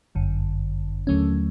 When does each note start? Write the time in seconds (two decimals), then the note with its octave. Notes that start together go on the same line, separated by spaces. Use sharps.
0.15 G1 F#2 D3
1.07 D#2 D3 F#3 A3 C#4